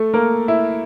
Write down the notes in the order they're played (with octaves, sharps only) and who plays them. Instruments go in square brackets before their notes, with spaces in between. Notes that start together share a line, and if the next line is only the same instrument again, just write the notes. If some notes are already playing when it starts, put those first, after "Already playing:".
Already playing: [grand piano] A3 A4
A#3 A#4
E4 E5